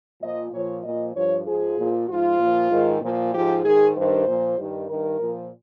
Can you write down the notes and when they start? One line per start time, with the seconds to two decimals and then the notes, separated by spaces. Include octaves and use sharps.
0.21 A#2 F3 D#5
0.52 A#2 F3 C#5
0.84 A#2 F3 D#5
1.15 G2 F3 C#5
1.46 G#2 F3 G#4
1.78 A#2 F3
2.08 G#2 F3 F4
2.39 A#2 F3
2.71 G#2 D#3
3.01 A#2 F3
3.33 G#2 F3 G4
3.64 G#2 D#3 G#4
3.95 G2 D#3 C5
4.27 A#2 F3
4.58 G2 D#3
4.89 G2 D#3 A#4
5.20 A#2 F3